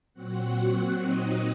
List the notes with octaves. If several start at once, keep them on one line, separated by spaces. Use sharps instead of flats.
A#2 F#3 C4 F#4 F#5
A#2 F#3 C4 D#4 D#5